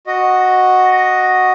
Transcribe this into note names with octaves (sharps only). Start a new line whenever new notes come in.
F#4 D#5